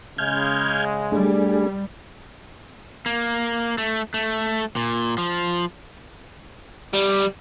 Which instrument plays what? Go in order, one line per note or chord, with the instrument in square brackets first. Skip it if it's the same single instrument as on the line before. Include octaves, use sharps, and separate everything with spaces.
[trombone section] C#3 G#3 [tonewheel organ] F6 G6 G#6
[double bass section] G3 [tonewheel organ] A3 D4 G#4
[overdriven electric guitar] A#3
A3
A3
A#2
F3
G3